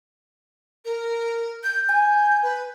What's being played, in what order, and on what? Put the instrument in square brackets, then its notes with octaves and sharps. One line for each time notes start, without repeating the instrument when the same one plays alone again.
[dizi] A#4
G6
[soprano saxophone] G#5 [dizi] G6
[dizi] B4